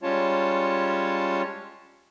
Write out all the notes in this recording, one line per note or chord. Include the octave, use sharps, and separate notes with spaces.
G3 G#3 C#4 F4 C#5 A5